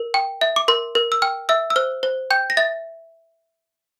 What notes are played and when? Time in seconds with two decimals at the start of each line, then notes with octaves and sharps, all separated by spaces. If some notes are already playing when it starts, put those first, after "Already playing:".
Already playing: A#4
0.14 G5
0.41 E5
0.56 D6
0.68 A#4 C6
0.95 A#4
1.12 E6
1.22 G5 F6
1.49 E5 E6
1.70 E6
1.76 C5 F6
2.03 C5
2.31 G5 G6
2.50 A#6
2.57 E5 A6